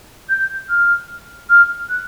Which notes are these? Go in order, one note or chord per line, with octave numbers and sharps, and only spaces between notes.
G6
F6
F6
F#6